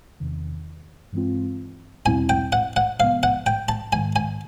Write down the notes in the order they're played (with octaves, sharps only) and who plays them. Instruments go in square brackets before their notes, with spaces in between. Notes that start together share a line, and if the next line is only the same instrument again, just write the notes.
[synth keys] E2 C3 D#3
G2 E3 G#3 C4 F4
[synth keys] E2 B2 G3 C4 E4 [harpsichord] G#5
[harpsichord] G5
F#5
F#5
[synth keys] C3 F3 G#3 B3 [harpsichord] F5
[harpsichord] F#5
G5
A5
[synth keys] G#2 D#3 G#3 [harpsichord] G#5
[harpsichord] G#5